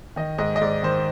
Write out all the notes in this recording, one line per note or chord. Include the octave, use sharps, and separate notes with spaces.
D#3 D#5
G#2 D#5
D#5
G#2 D5
D#3 C5